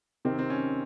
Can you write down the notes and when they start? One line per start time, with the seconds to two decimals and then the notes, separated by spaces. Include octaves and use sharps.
0.25 C3 D#3 C4
0.39 C4
0.50 C#4